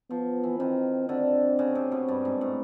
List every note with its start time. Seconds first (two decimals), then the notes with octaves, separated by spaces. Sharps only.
0.10 F3 B3
0.43 E3
0.59 D#3 C4
1.09 D3 C4
1.59 C#3
1.75 C3
1.91 B2
2.08 G2
2.25 G#2
2.41 A2